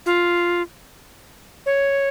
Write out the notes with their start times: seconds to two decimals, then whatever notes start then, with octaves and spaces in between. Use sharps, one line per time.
0.06 F4
1.66 C#5